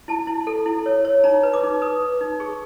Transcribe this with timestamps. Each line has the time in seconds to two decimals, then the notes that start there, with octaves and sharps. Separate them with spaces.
0.08 E4 A5
0.27 E4
0.47 A4
0.66 E4
0.86 C#5
1.05 C#5
1.24 D#4 A#5
1.43 B4
1.54 D6
1.63 D#4
1.82 B4 D#6
2.02 B4
2.21 D#4
2.40 G#4 C#6